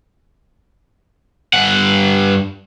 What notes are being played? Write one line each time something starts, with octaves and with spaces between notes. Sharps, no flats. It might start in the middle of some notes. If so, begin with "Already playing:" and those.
G2 F#5